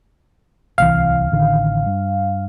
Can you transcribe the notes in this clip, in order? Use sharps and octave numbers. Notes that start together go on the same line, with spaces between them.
D1 C2 E3 F5
A1 D3 D#3
G2